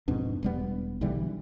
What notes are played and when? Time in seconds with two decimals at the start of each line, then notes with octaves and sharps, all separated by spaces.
0.08 F2 G#2 B2 D4
0.43 E1 G3 B3
1.01 B1 D3 E3 G3